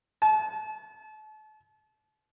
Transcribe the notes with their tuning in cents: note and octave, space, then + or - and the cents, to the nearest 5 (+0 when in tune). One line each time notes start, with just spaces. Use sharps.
A5 -35